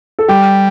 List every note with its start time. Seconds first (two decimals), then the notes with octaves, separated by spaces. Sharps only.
0.19 A4
0.28 G3 G4